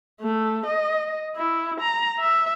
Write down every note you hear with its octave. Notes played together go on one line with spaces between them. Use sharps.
A3
D#5
E4
A#5
E5